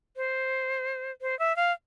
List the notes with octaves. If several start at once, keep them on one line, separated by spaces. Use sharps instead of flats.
C5
C5
E5
F5